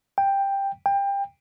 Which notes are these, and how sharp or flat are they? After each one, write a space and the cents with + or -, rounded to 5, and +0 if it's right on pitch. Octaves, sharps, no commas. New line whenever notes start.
G5 +10
G5 +25